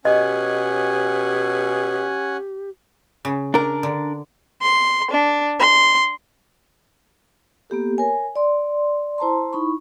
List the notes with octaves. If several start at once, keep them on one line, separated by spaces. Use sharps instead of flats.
B2 C#4 G4 D#5 F#5 G#5
C#3
D4 A#4
D3
C6
D4
C6
A#3 B3 G4 A4
A#4 C#5 G#5
D5 C6
E4 C5 A5 A#5 C6
D#4 E4 B5 C#6